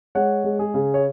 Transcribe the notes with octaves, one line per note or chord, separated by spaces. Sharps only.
G#3 C#5 F#5
G#3
G#4
C#3
C#5